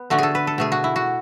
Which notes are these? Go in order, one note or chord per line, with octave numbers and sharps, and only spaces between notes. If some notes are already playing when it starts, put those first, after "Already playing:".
Already playing: B3
D3 A3 F#4
G#4 A4
B4
A4
B2 A3 G#4
F#4
E4
F#4